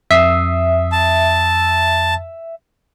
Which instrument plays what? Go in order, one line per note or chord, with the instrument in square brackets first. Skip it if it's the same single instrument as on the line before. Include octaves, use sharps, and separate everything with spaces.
[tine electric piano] F2 D#6 C7 [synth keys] E5
[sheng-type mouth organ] A5